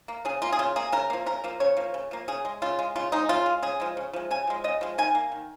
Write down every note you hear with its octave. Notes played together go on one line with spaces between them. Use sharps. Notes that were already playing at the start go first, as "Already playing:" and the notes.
A#3
C#3 G#4
A#3 F4
G#4
C#3 F4
A#3 G#4
C#3 A#4
F3 A#3
C#3 A#4
F3 A#3
C#3 C#5
F3 A#3
C#3
F3 A#3
C#3 G#4
G#3
C#3 F4
G#3
C#3 F4
G#3 D#4
C#3 F4
G#3
C#3 G#4
F3 G#3
C#3
F3 G#3
C#3 G#5
F3 G#3
C#3 D#5
F3 G#3
D#3 G#5
A#3
D#3